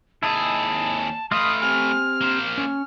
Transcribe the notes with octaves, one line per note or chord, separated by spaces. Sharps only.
D#2 E4 G#4 D#5 A5
A3 B4 D#5 F5 C6 D#6
C4 G4 G#5 F6
A#3 C5
C#4